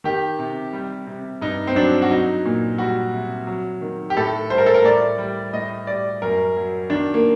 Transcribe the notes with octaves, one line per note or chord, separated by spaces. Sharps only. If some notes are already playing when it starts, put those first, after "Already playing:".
D#3 G4
C3
G3
C3
G2 D#4
C4
F#3 D4
F#4
F#3 D#4
A#2
G3 F#4
C3
F#3
D#3
G4
A2 A4
G3 C5
A#4
A4
A#4
A2 D5
G3
A2 D#5
G3 D5
F#2 A#4
F#3
D#3 D4
A#3